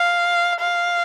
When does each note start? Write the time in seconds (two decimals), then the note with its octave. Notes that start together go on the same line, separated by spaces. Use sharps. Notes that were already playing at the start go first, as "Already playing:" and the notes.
Already playing: F5
0.60 F5